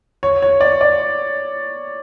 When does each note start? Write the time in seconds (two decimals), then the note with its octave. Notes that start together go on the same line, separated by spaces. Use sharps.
0.23 C#5
0.42 C#5
0.61 D5
0.81 D5